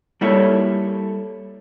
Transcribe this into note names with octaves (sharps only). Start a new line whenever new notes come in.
G3 A#3 E4 A4 C#5